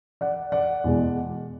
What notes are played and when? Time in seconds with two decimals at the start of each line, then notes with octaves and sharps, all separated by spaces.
0.21 D5 F#5
0.52 D5 F#5
0.84 E2 B2 G#3